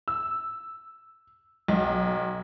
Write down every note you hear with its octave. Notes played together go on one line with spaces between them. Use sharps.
E6
B1